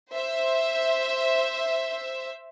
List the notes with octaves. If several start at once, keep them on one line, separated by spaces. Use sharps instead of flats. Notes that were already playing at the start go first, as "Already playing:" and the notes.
C5 E5